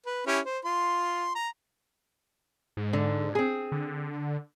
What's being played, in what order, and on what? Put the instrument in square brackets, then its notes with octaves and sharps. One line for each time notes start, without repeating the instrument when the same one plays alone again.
[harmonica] B4
C#4 E4 G4
C5
F4 C6
A#5
[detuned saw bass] G#2
[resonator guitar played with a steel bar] D3
C4 G#4
[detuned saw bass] D3